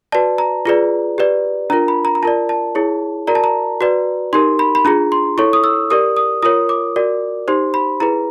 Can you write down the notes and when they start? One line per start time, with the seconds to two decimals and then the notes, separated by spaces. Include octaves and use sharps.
0.12 F#4 B4 D5 A5
0.38 A#5
0.65 F4 G#4 B4 D5
1.18 G4 B4 D5
1.70 D4 F4 A#4 A#5
1.88 B5
2.05 A#5
2.15 A#5
2.23 F4 A#4 D5 A5
2.49 A5
2.75 E4 G#4 C#5
3.27 F#4 A#4 D5 A#5
3.35 A5
3.44 A#5
3.81 F#4 B4 D5
4.33 D#4 G4 A#4 C6
4.59 B5
4.75 B5
4.85 D4 F4 G#4 A#5
5.12 C6
5.38 E4 A4 C#5 C#6
5.53 D#6
5.64 E6
5.90 G4 A#4 D5 D#6
6.17 D#6
6.42 F4 A#4 C#5 D#6
6.69 D6
6.96 F#4 A#4 D5
7.48 D#4 G4 C5 C6
7.74 B5
8.00 E4 G#4 B4 A#5